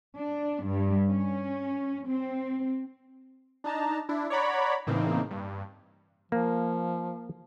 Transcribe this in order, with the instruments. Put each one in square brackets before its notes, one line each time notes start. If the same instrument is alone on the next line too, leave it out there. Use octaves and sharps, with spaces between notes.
[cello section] D4
G2
C#4
C4
[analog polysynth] D4 D#4 A5 A#5
D4 E4
C#5 D5 F#5 A#5 B5
A2 C#3 E3 A#3 C4 D#4
G2
[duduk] F3 [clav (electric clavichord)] A#3